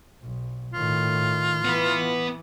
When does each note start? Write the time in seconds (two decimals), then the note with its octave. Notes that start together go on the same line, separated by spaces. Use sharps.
0.23 B1
0.74 A2 D#3 F4
1.65 E3 B3 B4